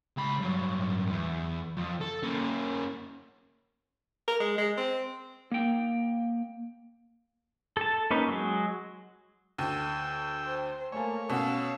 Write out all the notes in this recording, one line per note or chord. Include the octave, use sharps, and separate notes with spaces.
C#2 B5
G2 F#3
E2
F2
A4
A#3 C#4
A#4
G#3
G#3
C4
A#3 G5
A4 A5
A#3 C#4 D#4 B4
F#3 G#3
D2 G5 E6
C5
A3 A#3 C#5 G#5 A5
B2 C#4 F5 F#5 E6